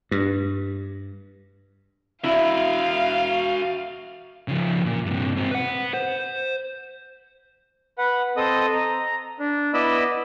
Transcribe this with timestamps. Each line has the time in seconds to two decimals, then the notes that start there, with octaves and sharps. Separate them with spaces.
0.11 G2
2.24 E4 F#4 E5 F5
4.48 C#3 F3
4.85 A#2
5.05 G2 C3
5.36 G#2 C4
5.51 B4 F#5
5.94 C5
7.98 B4 F#5
8.37 C4 A4 D#5 D#6
8.73 A#5
9.39 D4
9.74 B3 E4 D5 D#5 B5 E6